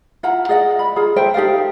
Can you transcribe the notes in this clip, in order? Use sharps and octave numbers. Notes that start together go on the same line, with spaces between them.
E4 F4 F#5 A#5
G#4 D5 D#5 F#5
B5
F4 G#4 A#5
A4 C5 E5 G5
D#4 G4 A4 F5